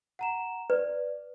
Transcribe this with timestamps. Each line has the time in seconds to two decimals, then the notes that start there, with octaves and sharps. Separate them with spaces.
0.19 F#5 A#5 E7
0.70 B4 D5